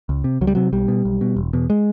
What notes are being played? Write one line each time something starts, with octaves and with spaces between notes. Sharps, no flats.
C#2
C3
C#2 F#3
G3
C3 F#3
B1 G3
B2
B1
B2
E1
E2 B2
G#3